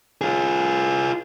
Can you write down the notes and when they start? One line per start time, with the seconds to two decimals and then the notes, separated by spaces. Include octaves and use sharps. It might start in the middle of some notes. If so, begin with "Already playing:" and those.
0.21 F4 G#4